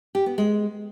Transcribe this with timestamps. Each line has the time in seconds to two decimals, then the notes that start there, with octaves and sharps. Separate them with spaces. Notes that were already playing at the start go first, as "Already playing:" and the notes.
0.15 G4
0.26 B3
0.38 G#3